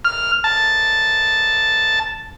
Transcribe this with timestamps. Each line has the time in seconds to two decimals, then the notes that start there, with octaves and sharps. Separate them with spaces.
0.05 F6
0.44 A5